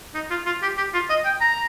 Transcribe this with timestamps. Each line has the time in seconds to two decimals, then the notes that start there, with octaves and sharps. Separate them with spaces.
0.14 D#4
0.30 F4
0.46 F4
0.62 G4
0.77 G4
0.93 F4
1.09 D#5
1.25 G5
1.41 A#5